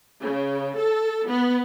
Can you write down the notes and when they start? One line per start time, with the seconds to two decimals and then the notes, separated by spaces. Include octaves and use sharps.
0.23 C#3
0.77 A4
1.28 B3